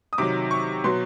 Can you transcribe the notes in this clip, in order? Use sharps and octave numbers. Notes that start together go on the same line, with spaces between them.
D#6
C3 D#3 F#3 D6
C#6
B2 F#3 C6